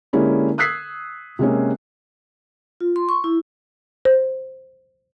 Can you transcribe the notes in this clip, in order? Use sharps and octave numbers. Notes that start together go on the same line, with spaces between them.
D3 G#3 A#3 C#4 E4 G4
D#6 E6 F#6 G#6 B6 C7
C3 G#3 A#3 C#4
F4
C6
C#6
E4
C5